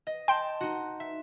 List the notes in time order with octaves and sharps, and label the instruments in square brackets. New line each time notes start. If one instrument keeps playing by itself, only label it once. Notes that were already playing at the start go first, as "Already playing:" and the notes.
[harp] D#5
[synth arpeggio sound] G5 [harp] A5 C6
[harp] D#4 F#4
E5